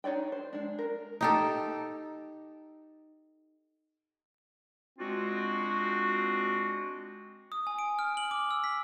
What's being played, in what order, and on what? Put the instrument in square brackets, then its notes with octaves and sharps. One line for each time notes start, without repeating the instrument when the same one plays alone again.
[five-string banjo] D4 D#4 C#5 D5 G5
C5
G#3 D4
A#4
[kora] D#4 G4 A4
[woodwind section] G#3 C4 D4 F4 F#4
[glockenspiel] D#6
G#5
D7
F6
F#7
D6
E6
B6